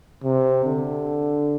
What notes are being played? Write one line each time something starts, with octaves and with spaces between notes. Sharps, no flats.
C3
D3